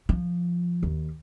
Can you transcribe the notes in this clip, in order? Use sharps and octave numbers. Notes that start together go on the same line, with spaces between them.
F3
D#2